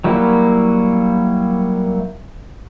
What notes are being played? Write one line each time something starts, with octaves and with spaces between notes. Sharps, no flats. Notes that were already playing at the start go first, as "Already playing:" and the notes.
F#3 G3 A#3 E4 F#4